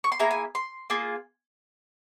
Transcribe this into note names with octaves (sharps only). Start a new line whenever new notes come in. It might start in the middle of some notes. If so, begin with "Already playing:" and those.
C#6
C6
A#3 E4 G#4 A#5
G#5
C6
A#3 F4 G#4